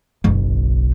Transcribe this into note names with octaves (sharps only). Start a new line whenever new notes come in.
F#1 B1